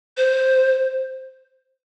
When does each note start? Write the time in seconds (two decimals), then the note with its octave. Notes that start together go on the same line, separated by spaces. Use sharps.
0.17 C5